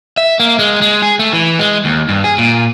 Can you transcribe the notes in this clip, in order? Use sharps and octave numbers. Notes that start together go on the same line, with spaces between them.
E5
A#3
G#3
G#3
G#4
A3
E3
G#3
D#2
G2
G#4
A#2